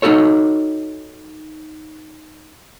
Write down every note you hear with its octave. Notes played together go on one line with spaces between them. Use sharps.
D#4 F4 F#4 A4 C#5